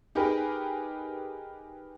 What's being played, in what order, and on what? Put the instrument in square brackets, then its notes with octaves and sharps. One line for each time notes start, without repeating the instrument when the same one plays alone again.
[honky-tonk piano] D#4 G4 G#4 A#4 B4